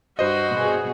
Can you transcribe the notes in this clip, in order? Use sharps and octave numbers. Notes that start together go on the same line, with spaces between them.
G2 F#4 C5 D#5
B2 G#4